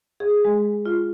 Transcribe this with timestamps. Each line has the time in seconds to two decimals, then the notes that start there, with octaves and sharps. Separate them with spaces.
0.20 G#4
0.45 G#3
0.86 F4